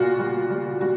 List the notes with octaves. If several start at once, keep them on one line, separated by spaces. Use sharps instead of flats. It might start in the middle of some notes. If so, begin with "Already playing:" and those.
Already playing: A#2 G3 F4 F#4
G3
G3
G3 F#4